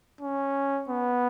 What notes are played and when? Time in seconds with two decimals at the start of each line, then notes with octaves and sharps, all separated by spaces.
0.21 C#4
0.89 B3